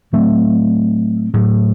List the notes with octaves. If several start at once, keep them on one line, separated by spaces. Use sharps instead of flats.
A2 F#3 A3 C4
A2 F#3 A3